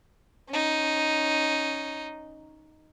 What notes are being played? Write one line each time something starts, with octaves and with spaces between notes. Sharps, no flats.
C#4 D#4